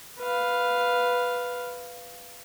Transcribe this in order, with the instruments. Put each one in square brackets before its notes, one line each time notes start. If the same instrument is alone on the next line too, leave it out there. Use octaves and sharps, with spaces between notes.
[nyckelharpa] B4 F5